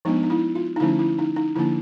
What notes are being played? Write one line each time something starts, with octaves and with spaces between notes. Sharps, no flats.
F3 G#3 B3 D4 D#4
D#4
E4
F4
D#4
D3 F3 A3 C#4 E4
E4
D#4
D#4
D3 F3 A#3 D4 E4